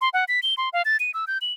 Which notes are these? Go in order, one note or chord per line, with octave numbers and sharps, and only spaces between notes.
C6
F#5
B6
G7
C6
F5
A6
D#7
E6
G6
F#7